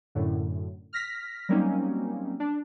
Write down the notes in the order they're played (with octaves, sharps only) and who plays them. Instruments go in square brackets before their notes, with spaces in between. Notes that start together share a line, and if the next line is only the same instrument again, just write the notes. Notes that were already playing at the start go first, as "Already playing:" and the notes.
[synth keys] F#2 A2 D3
F6 A#6 B6
F#3 G3 A#3 C4 C#4 D#4
D4